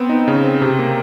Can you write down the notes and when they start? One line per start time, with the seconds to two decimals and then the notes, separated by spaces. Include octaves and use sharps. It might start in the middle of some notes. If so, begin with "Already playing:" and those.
Already playing: B3 C4
0.09 D#4
0.28 C#3
0.44 C4
0.61 C3
0.79 A#3